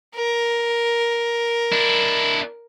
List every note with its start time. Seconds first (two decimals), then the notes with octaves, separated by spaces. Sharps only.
0.15 A#4
1.72 D4 E4